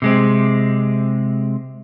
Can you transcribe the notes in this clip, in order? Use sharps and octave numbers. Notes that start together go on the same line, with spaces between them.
C3 G#3 C4